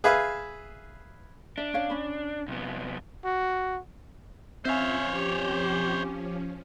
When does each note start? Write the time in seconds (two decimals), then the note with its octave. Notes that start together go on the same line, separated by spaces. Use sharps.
0.04 G#4 B4 E5 F5
1.58 D4 E5
1.74 C#4 C#5 F5
1.90 C#4 B5
2.48 C2 B3
3.24 F#4
4.65 F3 C4 C#4 C5 C#5 E5 F5 G#5
5.13 G4